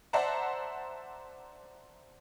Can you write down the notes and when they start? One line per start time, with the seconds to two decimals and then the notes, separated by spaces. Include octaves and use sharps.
0.13 C5 D5 E5 F#5 A5 A#5